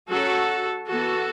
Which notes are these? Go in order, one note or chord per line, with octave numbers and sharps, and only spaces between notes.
F#3 C#4 F#4 A4
E3 B3 F#4 A4